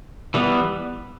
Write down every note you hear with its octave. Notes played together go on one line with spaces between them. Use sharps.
E3 G3 B3